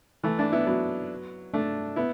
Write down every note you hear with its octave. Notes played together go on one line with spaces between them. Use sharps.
E3 A3
A3 D4
B3 E4
F#3 B3
A3 D4
B3 E4